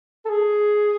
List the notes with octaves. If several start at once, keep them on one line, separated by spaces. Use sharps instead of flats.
A4
G#4